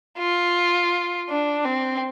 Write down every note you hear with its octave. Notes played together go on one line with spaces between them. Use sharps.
F4
D4
C4